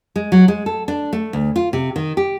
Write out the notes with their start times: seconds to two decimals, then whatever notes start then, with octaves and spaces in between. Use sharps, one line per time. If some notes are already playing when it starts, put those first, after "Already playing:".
0.16 G#3
0.32 F#3
0.48 G#3
0.66 A4
0.88 D4
1.13 A3
1.33 D2
1.56 F4
1.73 C3
1.96 D#3
2.17 G4